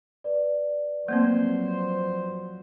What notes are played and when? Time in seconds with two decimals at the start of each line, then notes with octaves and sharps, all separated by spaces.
0.24 B4 D5
1.08 F3 F#3 A3 A#3 C4 C5